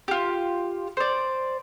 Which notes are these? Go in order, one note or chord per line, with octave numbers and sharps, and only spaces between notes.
F4 G4
C5 D5